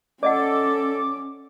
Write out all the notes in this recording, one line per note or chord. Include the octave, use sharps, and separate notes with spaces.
C#4 A4 D5 D#5 F#5 D6